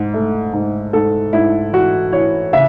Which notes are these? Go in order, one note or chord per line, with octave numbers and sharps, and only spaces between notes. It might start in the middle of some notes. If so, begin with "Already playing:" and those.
Already playing: G#2
A3
G#2
G#2 A4
G#2 E4
E3 F#4
E3 C#5
C#3 E5